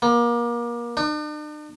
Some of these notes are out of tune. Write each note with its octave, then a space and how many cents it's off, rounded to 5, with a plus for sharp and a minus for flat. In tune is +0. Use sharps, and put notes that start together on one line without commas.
A#3 +30
D4 +45